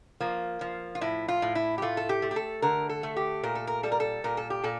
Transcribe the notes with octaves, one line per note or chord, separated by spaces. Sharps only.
F3 A#3
F3
F4
A2 E4
F4
A2
E4
G4
A3 F4
A4
G4
A3
G4
A4
D3 A#4
A4
A3
G4
A#2 A#4
A4
A#4
G3 A4
A#4
A4
A#2 A#4
A4
G4
A#2 A4